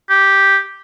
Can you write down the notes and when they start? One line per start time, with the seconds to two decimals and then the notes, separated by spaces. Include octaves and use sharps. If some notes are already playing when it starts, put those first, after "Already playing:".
0.10 G4